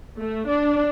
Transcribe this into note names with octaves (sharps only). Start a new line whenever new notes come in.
A3
D4